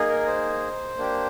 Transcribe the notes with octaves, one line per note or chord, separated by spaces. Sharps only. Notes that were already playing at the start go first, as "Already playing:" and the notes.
Already playing: A#3 D#4 G#4
A#4
C5
A#3 D4 G4